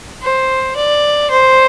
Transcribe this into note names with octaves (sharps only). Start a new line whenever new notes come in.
C5
D5
C5